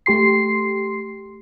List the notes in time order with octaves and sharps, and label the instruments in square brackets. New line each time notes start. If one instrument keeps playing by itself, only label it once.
[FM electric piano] A3 G4 C6 C7